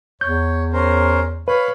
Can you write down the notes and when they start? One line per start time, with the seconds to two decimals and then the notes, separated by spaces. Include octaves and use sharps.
0.21 E2 C#5 G6
0.73 C#4 A#4 C5
1.48 B4 C#5 F5 B5